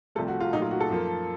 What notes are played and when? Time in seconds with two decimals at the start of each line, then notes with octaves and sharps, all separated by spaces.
0.15 C2 C3 F3 A3 A4
0.28 F#4
0.40 F4
0.52 A#2 F#3 A3 D#4
0.62 F4
0.71 F#4
0.80 A4
0.89 F#2 F3 A#3